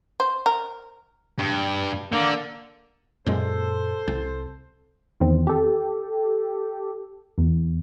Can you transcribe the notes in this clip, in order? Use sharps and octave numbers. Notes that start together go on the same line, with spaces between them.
C5
A#4
G2
D3 A#3
F#2 A#2 G#3 A4 C5
C2
E2 D#3 C4
G4 A4
E2